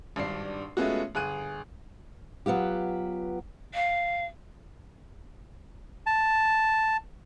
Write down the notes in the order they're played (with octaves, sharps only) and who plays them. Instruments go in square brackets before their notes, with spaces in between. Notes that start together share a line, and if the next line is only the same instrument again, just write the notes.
[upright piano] G#1 G2 D4 C7
G#3 A3 B3 C#4 F4 F#4
G1 G#4 F#6 D#7
[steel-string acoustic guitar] F#3 B3 F4 G4
[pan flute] F5
[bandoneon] A5